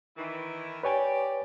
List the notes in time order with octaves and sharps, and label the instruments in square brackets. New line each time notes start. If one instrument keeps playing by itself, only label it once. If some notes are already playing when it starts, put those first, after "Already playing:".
[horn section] D#3 E3 E4
[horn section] G4 D5 [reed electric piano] B4 C#5 G#5